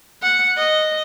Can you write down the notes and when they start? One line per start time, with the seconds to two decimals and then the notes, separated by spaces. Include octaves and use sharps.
0.23 F#5
0.57 D#5